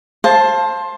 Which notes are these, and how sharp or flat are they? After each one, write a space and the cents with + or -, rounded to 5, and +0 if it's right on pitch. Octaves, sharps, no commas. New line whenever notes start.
C5 +20 F5 +0 A5 +0